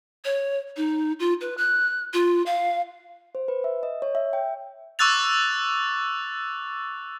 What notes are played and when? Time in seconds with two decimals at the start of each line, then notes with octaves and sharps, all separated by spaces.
0.25 C#5
0.77 D#4
1.20 F4
1.41 B4
1.58 F#6
2.13 F4
2.46 F5
3.35 C5
3.48 B4
3.64 E5
3.83 D#5
4.02 C#5
4.15 E5
4.33 G5
4.99 C#6 D6 E6 F#6 A6 F7